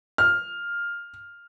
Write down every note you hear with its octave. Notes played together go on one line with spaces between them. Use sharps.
F6